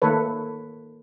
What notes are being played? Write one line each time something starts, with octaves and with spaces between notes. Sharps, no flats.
D#3 A3 A#3 A4 B4 C#5